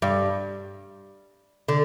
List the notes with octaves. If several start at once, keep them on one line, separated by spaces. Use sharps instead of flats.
G2
D3